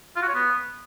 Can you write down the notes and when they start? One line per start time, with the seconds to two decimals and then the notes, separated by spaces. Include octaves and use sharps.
0.16 F4
0.22 F#4
0.28 C#5
0.34 B3